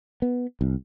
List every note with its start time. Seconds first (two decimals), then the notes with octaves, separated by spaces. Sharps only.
0.22 B3
0.61 C2